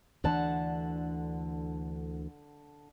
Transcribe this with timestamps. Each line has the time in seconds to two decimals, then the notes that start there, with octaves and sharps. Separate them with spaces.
0.24 D2 D3 E3 D4 F#5 A5